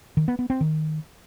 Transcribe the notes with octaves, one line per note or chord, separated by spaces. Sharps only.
D#3
B3
B3
C4
D#3